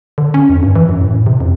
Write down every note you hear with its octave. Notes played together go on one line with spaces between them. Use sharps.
D3
C#4
F2
G2
E3
F#2
A2
C3
F2